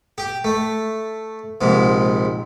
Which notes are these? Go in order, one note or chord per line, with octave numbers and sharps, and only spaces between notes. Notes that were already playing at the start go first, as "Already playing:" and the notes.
G4
A3
A#1 G#2 C3